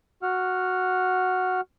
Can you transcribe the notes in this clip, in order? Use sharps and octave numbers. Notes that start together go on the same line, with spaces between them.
F#4 F#5 F6